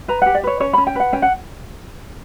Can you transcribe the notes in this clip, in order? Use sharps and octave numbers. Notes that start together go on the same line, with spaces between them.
B4 A#5
G4 F#5
D5
B4 C#5
C#4 C#5
C#4 B5
G5
B4 F#5
C#4 G5
F#5